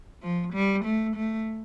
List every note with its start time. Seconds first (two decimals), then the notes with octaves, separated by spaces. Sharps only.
0.22 F3
0.54 G3
0.85 A3
1.16 A3